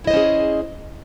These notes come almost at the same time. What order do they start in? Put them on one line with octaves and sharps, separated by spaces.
E4 D#5 C5 C#4 G#4